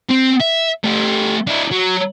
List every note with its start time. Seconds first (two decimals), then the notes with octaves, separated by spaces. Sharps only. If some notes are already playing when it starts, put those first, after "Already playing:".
0.10 C4
0.41 E5
0.84 A3 G4
1.47 D4 E4
1.71 F#3